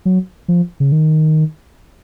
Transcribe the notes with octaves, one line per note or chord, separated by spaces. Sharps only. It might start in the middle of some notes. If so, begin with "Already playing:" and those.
F#3
F3
C#3
D#3